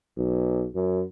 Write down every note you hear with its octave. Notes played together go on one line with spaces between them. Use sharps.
B1
F#2